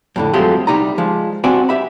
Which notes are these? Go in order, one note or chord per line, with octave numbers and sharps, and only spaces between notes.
F2 A2 D3
C3 F3 F#3 G#3 A3 G4
C2 G3 D#4 A#5
F3 G#3
C2 C4 D4 F#4 G5 G#5
G4 E5 B5